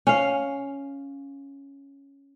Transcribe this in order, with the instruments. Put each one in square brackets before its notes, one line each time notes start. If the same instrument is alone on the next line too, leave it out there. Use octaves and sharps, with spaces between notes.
[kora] C#4 F5